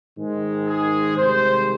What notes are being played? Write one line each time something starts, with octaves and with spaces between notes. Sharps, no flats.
G#2 D#3 G#3
G#4
C2 C3 D#3 G#3 C5